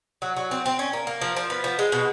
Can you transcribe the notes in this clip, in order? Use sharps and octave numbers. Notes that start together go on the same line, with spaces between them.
F#3
F#3
C4
C4
C#4
A#3
A#3
F3
F3
B3
F3
G#3
B2